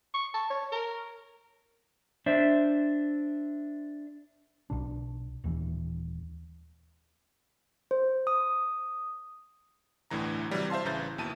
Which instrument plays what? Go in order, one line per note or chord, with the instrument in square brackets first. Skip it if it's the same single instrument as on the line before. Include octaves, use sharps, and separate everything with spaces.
[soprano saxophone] C#6
A5
C#5
A#4
[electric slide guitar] D4 C5 E5
[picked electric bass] B1 B2 D4
D#1 D#2 E3
[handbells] C5
D#6
[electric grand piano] G1 D2 A2 D3 E3 A#5
C3 E3 F#3 G3
C5 E5 F5 A5 C6
A1 C#3 E3 A#5 G6 A6
D#2 B2 E4 A5 D#7